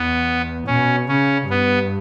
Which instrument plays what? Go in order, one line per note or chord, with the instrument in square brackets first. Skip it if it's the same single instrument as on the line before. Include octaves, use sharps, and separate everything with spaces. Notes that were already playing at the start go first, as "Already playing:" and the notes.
Already playing: [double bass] E2 [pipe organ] B3
[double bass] B2 [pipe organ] C#4
[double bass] C#3 [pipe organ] C#4
[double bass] G2 [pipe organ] B3